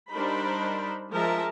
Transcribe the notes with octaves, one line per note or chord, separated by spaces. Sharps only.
G3 D4 D#4 A#4 C5 B5
F3 G#3 A#4 E5 A5